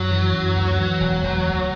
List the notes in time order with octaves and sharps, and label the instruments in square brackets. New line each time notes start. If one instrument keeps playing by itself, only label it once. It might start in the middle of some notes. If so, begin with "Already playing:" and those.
Already playing: [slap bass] F#2 [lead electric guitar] F#3
[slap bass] E3
F#2
D2
E3
E1
E1
D2